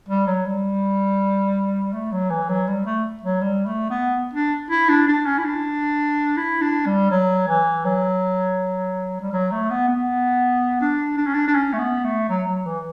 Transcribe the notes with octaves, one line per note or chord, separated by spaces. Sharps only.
G3
F#3
G3
A3
F#3
E3
F#3
G3
A3
F#3
G3
A3
B3
D4
E4
D4
D4
C#4
E4
D4
E4
D4
G3
F#3
E3
F#3
G3
F#3
A3
B3
B3
D4
D4
C#4
D4
D4
C#4
A3
B3
A3
F#3
F#3
E3